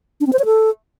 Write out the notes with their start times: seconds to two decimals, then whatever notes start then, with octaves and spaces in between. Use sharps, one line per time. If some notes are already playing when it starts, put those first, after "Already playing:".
0.21 D4
0.27 C4
0.33 C5
0.39 C#5
0.45 A4